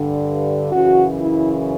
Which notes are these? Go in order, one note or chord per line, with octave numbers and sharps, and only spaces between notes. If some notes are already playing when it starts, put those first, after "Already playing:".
Already playing: G2 D3
F#2 C#3 E3 F#4
E4